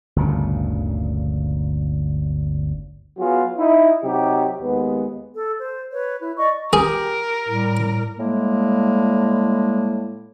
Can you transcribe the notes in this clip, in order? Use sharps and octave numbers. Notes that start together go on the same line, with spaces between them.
G1 D2 A#2 C#3
F#3 B3 F4 F#4 G#4
D#4 E4
C3 F#3 D#4 G4
D#2 G#3 B3
A4
C5
B4 C#5
E4
D5 D#5 C#6
G4 G#4 A#4
A2 G3
A2 G3 G#3 A#3